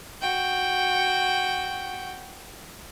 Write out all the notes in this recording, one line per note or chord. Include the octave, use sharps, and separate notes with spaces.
F#4 G5